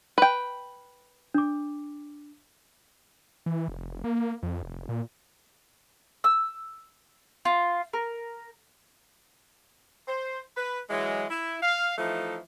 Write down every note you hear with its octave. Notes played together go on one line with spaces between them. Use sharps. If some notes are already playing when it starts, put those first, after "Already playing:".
B4 G5
D4 D6
E3
F1
A#3
F2
F1
A#2
E6
F4
A#4
C5
B4
E3 F#3 G#3
E4
F5
E3 F3 A3 D#4